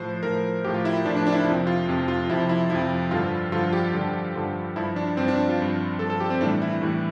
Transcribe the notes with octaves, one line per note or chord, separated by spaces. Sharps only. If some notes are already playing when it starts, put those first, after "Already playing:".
Already playing: A2 F3 C5
A2 F3 A#4
A2 F3 G4
F4
E4
A2 F3 D4
D4
D4
E4
D4
F2 C3 F3 E4
F4
F2 C3 F3
F4
F2 C3 F3 E4
E4
F2 C3 F3 E4
G2 D3 F3 F4
G2 D3 F3 F4
G4
G2 D3 F3
G2 D3 F3
G2 F3 E4
D4
G2 F3 C4
D4
F4
G2 F3
G2 F3 A4
A4
G4
C4
A2 E3 G3 D4
E4
A2 E3 G3